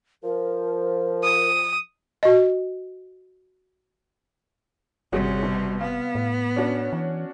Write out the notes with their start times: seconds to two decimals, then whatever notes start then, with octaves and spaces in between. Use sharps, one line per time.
0.23 F3 A#4
1.24 D#6
2.23 F#4 D#5
5.13 G1 C3 G3 C#4 F#4 G#4
5.43 B2
5.81 B3 F5
6.15 A2
6.56 C#4 D4 F#4
6.93 E3